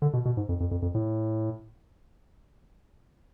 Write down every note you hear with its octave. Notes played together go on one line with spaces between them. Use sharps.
D3
B2
B2
G#2
F2
F2
F2
F2
A2